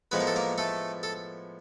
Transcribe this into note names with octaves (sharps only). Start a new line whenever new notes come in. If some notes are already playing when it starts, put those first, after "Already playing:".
A2 F3 G#3 B3 B4
A#4
A4
A#3 A#4
A3 A4
A4